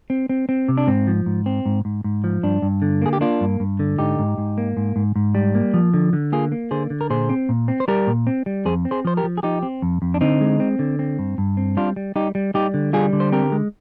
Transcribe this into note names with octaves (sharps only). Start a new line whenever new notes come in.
C4
C4
C4
C3
D4
G#2 C4
F3
G#2
C4
G#2
G#2
G#2
F3
G2 D4
G2
D3
A#3 G#4
G4
A#3 D4 F4
G2
G2
D3
G#2 D#4 G4
G#2
G#2
A#3
G#2
G#2
G#2
G3
A#3
F3
D3
D3
A#3 F4 G#4
A#3
D3 G#4 C5
D3
A#4
A#2 G#4 C5
C4
A#2
C4
C5
G3 G4 A#4
A#2
C4
G3
F2 G#4 C5
C4
G#4 C5
F3 C5
G4 A#4
F3
G#4
F3 D#4 G4
C4
F2
F2
D4
D3 C4 D#4
G#3
C4
D3
C4
G2
G2
C4
G3 D4 F4
G3
G3 D#4 G4
G3
G3 D#4 G4
D3
G3 F4 G#4
D3
C5
C4 G4 A#4
G#3